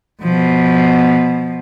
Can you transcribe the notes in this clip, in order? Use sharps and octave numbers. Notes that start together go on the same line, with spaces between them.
B2 F3